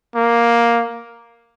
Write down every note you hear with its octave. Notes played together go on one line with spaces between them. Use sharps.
A#3